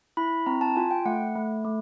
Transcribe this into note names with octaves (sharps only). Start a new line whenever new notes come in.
E4 B5
C4 A#5
A5
F4 G#5
G5
A3 F#5
A3
A3